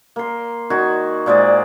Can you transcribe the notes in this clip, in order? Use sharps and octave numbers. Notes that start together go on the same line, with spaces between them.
A#3 C6
D#3 F#4 G#5
A#2 G#3 C5 D5